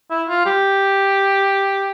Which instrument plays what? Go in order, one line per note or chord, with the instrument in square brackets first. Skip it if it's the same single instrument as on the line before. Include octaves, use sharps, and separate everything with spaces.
[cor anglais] E4
F4
G4